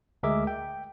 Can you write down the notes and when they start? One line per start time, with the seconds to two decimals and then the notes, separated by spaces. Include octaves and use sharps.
0.23 D2 G#3 G#4 A#4 E5 D6
0.47 G5